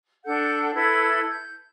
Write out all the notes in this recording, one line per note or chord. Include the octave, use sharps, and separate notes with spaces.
D4 A4 F#5 G6
E4 A4 B4 G#6
G6